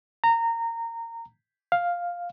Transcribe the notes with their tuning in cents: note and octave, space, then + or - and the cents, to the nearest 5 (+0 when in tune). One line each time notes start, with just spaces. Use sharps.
A#5 -20
F5 +5